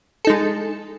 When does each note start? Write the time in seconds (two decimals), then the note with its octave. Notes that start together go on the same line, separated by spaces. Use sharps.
0.25 A4
0.27 D#4
0.30 G#3